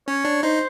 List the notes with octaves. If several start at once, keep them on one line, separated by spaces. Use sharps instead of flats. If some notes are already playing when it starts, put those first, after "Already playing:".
C#4 C#5
D4
D#4 C5